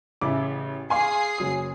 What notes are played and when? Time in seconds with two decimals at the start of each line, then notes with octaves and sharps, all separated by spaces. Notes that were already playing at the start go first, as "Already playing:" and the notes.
0.21 A1 C#3 E4 D6
0.90 G#4 F5 G#5 C6 D6 C7
1.38 F#1 F#3 D#6